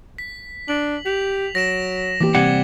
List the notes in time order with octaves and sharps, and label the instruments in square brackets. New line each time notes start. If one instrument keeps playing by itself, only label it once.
[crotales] B6
[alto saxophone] D4 [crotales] F#7
[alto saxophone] G4 [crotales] B6 F7
[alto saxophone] F#3 [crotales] A#6 D7 E7
[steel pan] E3 A#3 G4 [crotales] D6 A#6
[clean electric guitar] C3 G3 F#5 [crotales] D6 G#6